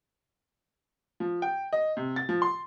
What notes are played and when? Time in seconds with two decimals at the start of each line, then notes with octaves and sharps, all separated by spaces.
1.20 F3
1.42 G5
1.73 D#5
1.97 C3
2.16 A6
2.29 F3
2.42 C6